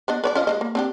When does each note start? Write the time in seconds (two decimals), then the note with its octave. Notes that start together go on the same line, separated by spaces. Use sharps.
0.08 B3 D4 D#5
0.24 B4 C#5 D5
0.35 C#4 F4 D#5
0.47 G#3 C4 D#5
0.61 A#3
0.75 C4 D4 G4